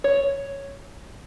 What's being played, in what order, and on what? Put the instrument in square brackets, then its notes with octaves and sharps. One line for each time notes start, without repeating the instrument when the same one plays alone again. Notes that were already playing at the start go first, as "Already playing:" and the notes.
[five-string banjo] C#5